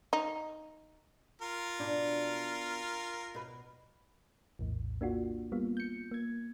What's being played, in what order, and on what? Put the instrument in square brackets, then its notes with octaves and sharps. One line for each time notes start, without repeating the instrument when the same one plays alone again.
[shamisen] D#4
[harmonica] F4 A#4
[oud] B2 D4
B2 B4
[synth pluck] A#1 E2 A2
A#3 D4 F4 F#4
G3 A#3 B3 F4
G6 C#7
A#3 G#6